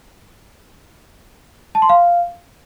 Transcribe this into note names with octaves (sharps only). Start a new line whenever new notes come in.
A5
C6
F5